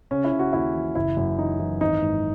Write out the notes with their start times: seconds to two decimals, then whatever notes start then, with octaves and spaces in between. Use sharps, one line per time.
0.11 C#3 C#4
0.24 E4
0.32 C#3
0.39 F#4
0.53 D#2 E4
0.74 E3
0.95 F#1 E4
1.17 F#2
1.38 E3 D#4
1.60 E3
1.81 G#1 D#4
2.02 G#2